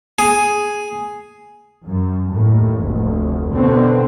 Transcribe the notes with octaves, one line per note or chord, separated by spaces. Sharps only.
G#4
F#2
D#2 A2
F1 D2
B2 D3 C4